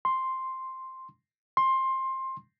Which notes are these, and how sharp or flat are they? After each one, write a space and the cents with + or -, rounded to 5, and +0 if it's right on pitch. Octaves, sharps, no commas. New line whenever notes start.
C6 +5
C6 +20